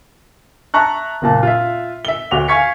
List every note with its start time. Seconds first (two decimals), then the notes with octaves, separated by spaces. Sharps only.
0.74 E5 A5 A#5 C#6 F#6
1.22 F#1 A#2 A5
1.43 F4 E5
2.05 E5 G7
2.31 D2 F#4 D6 F7
2.48 F5 G#5 C#6 G#6 B6 C#7